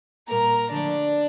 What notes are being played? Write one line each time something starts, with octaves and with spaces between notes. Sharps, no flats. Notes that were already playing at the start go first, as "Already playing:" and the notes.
A#2 G3 A#3 A#4 A#5
D3 F3 A3 D4 D5